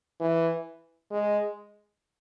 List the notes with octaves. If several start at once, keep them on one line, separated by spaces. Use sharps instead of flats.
E3
G#3